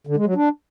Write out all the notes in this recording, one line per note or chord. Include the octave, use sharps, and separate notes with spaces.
D3
G#3
F#3
D4